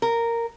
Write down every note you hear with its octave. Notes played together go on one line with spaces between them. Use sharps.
A#4